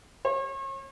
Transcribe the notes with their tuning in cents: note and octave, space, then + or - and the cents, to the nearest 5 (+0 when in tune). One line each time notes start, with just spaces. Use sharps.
C#5 -40